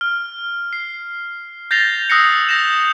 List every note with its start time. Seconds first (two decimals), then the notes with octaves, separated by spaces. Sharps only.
0.01 F6
0.73 C7
1.71 G6 A6 A#6 C7 F7 G7
2.10 D#6 E6 F#6 A#6 C7 C#7
2.49 G6 A#6 E7